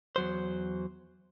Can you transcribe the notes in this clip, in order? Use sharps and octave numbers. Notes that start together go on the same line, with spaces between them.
E2 F#3 C5